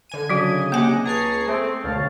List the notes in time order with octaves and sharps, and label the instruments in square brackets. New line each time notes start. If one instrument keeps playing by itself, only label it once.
[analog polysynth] D3 G#5 D#7
[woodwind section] C#3 D#5 [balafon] F#3 F#4
[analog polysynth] C3 F#5 D6 [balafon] A#3 G#5
[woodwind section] C#2 G#4 A5 [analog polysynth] A#5 C#6 C7
[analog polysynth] A3 [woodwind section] C4
[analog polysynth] D2 B2 [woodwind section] C#5 F5 A5